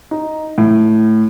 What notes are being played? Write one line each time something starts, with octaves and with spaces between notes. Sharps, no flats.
D#4
A2